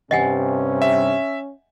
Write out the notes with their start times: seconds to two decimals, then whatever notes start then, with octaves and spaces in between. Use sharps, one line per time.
0.11 G2 C3 C#4 D#5 F#5 G#5
0.82 E5